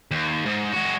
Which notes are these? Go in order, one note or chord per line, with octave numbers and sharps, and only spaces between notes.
D#2
G#2
G#3 F#4